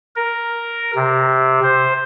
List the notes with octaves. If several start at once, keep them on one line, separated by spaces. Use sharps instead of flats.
A#4
C3
C5